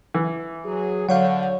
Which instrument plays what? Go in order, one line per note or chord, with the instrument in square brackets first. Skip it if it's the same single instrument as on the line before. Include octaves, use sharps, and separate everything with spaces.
[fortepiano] E3
[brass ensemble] F#3 G#4
[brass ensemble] D3 [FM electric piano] F#3 C#5 G6 [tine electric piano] F5 F#5